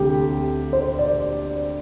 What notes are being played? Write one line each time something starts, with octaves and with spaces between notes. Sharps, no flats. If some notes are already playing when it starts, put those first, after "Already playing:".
Already playing: D2 C3 G4
C5
D5